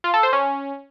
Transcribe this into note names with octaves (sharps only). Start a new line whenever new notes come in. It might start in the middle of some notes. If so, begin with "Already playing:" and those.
F4
A4
C5
C#4